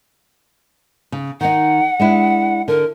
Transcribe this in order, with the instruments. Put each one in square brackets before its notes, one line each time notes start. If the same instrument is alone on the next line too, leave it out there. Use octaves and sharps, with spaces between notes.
[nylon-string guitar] C#3
[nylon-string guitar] D#3 D#4 [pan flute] F#5
[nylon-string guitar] G#3 D4 E4
[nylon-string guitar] D3 [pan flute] A#4